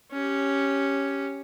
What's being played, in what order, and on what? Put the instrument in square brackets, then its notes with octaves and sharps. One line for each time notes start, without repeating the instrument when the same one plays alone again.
[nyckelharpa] C#4 G4